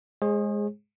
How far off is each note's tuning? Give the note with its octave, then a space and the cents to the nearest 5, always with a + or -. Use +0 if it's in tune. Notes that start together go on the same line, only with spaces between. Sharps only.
G#3 +0 G#4 -10 C5 +45